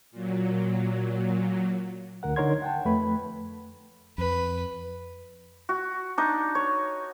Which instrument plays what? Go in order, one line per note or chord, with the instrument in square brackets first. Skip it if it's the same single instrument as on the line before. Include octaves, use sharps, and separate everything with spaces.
[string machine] A#2 F#3
[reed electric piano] D2 D3 A#4 F#5
D3 D#4 A#4 C#5 C6 G#6
F#5 G5 A5
F2 A3 B4 B5
[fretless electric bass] F2 [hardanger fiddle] B4
[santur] F#4
D4 D#4
C#5